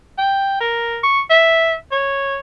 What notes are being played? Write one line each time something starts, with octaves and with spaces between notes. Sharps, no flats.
G5
A#4
C#6
E5
C#5